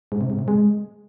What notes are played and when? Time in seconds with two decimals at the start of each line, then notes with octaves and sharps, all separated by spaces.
0.12 G#2
0.21 C3
0.30 G#2
0.39 C3
0.48 G#3